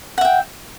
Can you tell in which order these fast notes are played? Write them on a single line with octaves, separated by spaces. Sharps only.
F#5 E5 G5